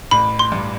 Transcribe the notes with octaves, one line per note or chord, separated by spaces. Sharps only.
A1 B5
C6
G2